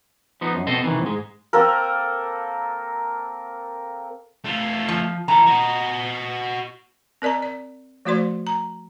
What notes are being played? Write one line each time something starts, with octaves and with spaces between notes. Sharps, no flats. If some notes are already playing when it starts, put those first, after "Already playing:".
F3 B3 D#4
F#2
B2 C4 A4 C5 D#5
C3 D#3 E3
G#2 G#3
A#3 C4 A4 A#4
A3 F4
F3
E3 A4 A#5
F#4 D#5
C4 A#4 D5 D#5 A#5
D5
F3 A3 F#4 C5 D5 C6
A#5